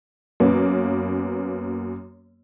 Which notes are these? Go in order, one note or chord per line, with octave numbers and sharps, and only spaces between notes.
F#2 A#3 B3 C#4